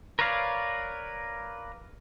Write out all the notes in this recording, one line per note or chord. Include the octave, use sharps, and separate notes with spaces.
A#4 B4 C#5 D5 F5